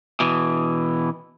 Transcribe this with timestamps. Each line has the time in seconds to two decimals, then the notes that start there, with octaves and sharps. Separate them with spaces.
0.20 B2 E3